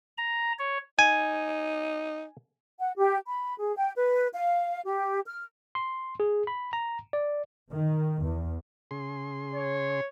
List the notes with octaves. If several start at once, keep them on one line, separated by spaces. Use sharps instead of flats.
A#5
C#5
D#4 G#5
F#5
G4
B5
G#4
G5
B4
F5
G4
F6
C6
G#4
B5
A#5
D5
D#3
E2
C#3 G#4 C6
C#5